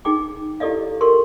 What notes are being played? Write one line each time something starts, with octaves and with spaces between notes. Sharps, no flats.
D#4 G#4 G5 D6
E4 G4 A4 D5 D#5 F5
G4 A4 A#4 C6 C#6